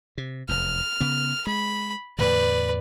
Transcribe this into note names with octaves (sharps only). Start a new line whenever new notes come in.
C3
F1 E2 F6
C#3 B3
G#3 B5
E2 A2 D3 B4 D5